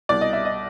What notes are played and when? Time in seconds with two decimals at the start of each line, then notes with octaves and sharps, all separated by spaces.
0.09 C2 B2 D5
0.21 D#5
0.33 E5
0.45 D#5